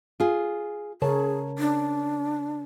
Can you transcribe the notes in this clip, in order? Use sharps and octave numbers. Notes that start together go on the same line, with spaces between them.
F4 G#4
C#3 G#4 A#4 C#5 A5
D4